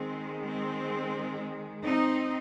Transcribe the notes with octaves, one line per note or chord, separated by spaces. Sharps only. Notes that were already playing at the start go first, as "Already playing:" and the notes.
Already playing: D#3 G#3 C4
C4
C4 D#4